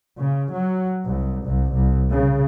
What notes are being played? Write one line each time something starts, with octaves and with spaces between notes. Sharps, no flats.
C#3
F#3
C2
C2
C2
C#3